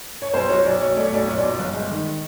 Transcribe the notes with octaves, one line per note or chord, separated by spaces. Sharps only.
C#5
B1 C5
F#3 C#5
B1 D5
B1 C#5
A3 D5
C#5
B1 D5
A#2 C#5
D5
B1
G1
G#3
D#3